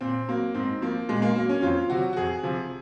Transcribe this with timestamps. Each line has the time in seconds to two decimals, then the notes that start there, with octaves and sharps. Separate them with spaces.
0.01 A#2 C4
0.28 F#3 A#3
0.54 G#2 C4
0.82 F3 A#3
1.08 A#2 G#3
1.22 A#3
1.35 F#3 A#3
1.49 C#4
1.62 F2 F4
1.90 C3 F#3 F#4
2.13 F#4
2.17 F2 G#4
2.43 C3 F3